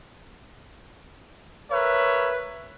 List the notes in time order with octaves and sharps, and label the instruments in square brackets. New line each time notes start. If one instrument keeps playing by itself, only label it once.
[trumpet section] A#4 B4 C#5 E5